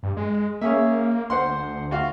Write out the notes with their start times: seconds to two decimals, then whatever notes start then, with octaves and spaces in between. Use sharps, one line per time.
0.03 G2
0.17 G#3
0.61 A#3 C#4 G#4 E5
1.30 D2 C5 F#5 C6
1.91 F4 F#4 F5